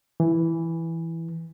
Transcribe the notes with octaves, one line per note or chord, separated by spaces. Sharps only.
E3